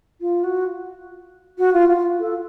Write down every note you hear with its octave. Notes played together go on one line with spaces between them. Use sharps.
F4
F#4
F#4
F4
F4
A4